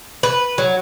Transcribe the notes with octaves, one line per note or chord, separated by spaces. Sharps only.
B4
F#3